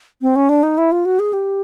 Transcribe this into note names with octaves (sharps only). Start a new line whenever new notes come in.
C4
C#4
D4
D#4
E4
F4
F#4
G#4
G4